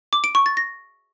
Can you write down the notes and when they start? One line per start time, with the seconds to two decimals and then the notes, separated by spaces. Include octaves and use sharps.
0.13 D6
0.24 D7
0.35 C#6
0.46 A6
0.57 A#6